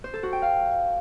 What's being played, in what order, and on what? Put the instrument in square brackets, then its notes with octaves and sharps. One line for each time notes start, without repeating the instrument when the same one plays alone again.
[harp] C5
A4
F#4
G5
F5